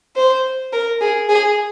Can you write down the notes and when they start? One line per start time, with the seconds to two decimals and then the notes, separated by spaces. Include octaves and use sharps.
0.16 C5
0.73 A#4
1.01 G#4
1.29 G#4